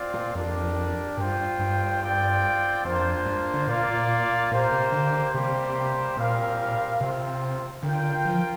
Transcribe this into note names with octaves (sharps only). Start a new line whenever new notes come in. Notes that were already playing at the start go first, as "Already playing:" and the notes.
Already playing: C4 F4 D5
A#2
F2 D4 G4 A#4 D5
G2 F4 C5 G5
G2
C4 F4 D5 G5
F2 A#3 D4 F4 C5
G2
D3
A#2 A#3 F4 D5 F5
A#2
A#2 A#3 G4 C5 F5
C3
D3
C3 G3 A#3 G4 C5
A#2 G3 C4 A#4 F5
C3 C4 F4 C5
D3 F4 A#4 G5
F3